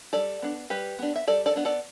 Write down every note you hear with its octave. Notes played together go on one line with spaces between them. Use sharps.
G3 A4 D5
B3 D4
G3 G4 B4
B3 D4
E5
G3 A4 D5
A4 D5
B3 D4
A4 D5